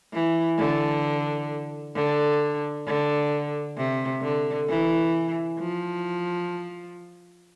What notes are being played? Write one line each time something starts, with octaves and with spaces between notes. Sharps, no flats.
E3
D3
D3
D3
C3
D3
E3
F3